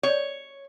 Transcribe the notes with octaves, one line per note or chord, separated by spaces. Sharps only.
C#5